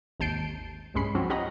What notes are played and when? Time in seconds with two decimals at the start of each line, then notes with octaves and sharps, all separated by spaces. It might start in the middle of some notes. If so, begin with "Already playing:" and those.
0.20 G#1 D#2 A5 G6 C7 D7
0.94 C2 G2 G#3 C#4 B5 C7
1.15 F3 F#3 C4 C#4
1.30 C#4 G4 D#5 F#5 A#5 B5